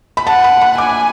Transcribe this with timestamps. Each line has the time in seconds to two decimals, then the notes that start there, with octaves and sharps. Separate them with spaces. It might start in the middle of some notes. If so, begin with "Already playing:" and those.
0.17 B5
0.27 F#5 A5
0.44 B5
0.61 B5
0.78 G#5 D6